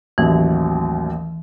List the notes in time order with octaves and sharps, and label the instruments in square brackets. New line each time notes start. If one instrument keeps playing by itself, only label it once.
[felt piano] A1 D#2 F#3 [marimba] E3